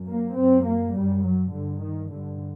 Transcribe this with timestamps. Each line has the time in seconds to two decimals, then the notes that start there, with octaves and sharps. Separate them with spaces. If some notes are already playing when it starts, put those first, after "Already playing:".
Already playing: F#2
0.09 A#3
0.38 F#2 C4
0.66 A#3
0.95 F#2 G3
1.24 F#3
1.53 G2 D3
1.81 D#3
2.10 G2 D3